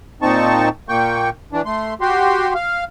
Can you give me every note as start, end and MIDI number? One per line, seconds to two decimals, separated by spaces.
0.22 0.69 46
0.22 0.69 60
0.22 0.69 63
0.22 0.69 81
0.22 0.69 85
0.89 1.29 46
0.89 1.29 58
0.89 1.29 79
0.89 1.29 85
1.53 1.62 52
1.53 1.62 62
1.66 1.94 57
1.66 1.94 84
2.01 2.53 66
2.01 2.53 67
2.01 2.53 84
2.55 2.84 77